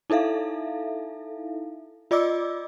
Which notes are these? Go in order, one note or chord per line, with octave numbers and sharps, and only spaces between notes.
D#4 E4 A4 E5 F5
F4 D5 D#5 D6 E6